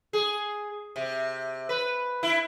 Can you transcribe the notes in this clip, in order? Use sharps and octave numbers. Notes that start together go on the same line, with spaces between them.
G#4
C3
B4
E4